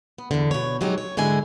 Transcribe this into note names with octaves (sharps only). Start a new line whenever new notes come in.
B3
E2 D3
B2 C#5
C3 F#3 G#3 C#4 D#4 G4
C#5
G#2 D3 G#3 E4 G#5